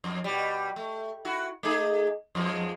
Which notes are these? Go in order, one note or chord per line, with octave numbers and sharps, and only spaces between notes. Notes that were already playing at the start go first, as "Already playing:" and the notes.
F2
B2 G3
A3
E4 F#4
A3 D#4 G#4
F2 F3 G#3